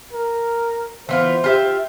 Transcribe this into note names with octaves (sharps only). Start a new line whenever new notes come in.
A#4
E3 B3 F4 C5
F4 G4 E5